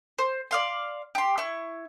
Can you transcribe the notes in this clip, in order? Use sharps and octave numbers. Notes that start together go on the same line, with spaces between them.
C5
D5 F5 C6
G4 C6
E4 C#6